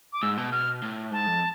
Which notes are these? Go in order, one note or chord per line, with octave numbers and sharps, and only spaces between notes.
D6
G#2 E6
B2
B2 F6
A2
G#2 A5
F2